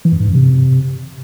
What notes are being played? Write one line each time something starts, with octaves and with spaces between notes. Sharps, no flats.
E3
F#2
G#2
F#2
C3